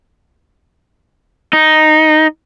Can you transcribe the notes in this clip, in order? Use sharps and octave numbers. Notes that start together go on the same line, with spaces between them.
D#4